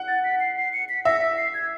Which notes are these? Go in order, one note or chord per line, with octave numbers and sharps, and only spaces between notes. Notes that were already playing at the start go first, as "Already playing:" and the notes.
Already playing: F#5
A6
B6
C7
C7
C#7
B6
E5 A#6
B6
C7
G#6